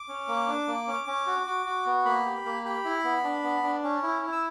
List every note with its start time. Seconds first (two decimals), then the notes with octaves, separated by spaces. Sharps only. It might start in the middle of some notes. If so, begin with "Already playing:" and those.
Already playing: D6
0.09 C#4
0.28 A#3
0.48 D4
0.68 A#3
0.88 C#4
1.07 C#4
1.27 F#4
1.47 F#4
1.66 F#4
1.86 B3
2.05 A#3 B5
2.25 G4
2.45 A#3
2.65 G4 B5
2.85 E4
3.04 B3
3.24 D4
3.44 B3
3.63 D4
3.84 C#4
4.03 E4
4.23 E4
4.32 E6